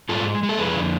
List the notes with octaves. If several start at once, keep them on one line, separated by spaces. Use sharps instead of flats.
G#2 F4 A4
G#3
G#3
A4
F2 G#4 B4
D3